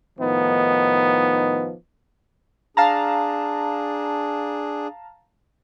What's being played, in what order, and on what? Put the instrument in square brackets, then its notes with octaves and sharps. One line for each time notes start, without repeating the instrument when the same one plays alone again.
[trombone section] A2 D#3 F3 B3 D#4
[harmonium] D4 G#4 [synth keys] F5 A5 A#5